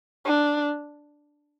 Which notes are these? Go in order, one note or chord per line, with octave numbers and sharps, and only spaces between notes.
D4